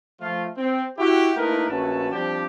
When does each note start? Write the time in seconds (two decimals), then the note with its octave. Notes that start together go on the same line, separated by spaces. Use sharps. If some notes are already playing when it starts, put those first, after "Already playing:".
0.20 F3 A3 F4
0.57 C4
0.98 E4 F#4 G4
1.37 A3 A#3 D#4 E4 A#4 B4
1.69 A#1 A3 C#4 F#4 B4 A5
2.12 F3 G3 C4 D4 G4